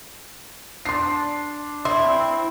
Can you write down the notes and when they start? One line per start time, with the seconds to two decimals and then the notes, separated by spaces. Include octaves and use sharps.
0.85 D4 C6 C7
1.85 E4 C6
2.04 C4